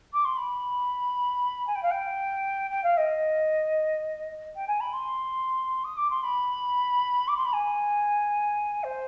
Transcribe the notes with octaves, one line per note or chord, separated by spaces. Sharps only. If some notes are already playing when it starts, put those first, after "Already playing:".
D6
C6
B5
G#5
G5
F5
G5
G5
F5
D#5
G5
G#5
B5
C6
D#6
D6
C6
B5
D6
C6
B5
G#5
C5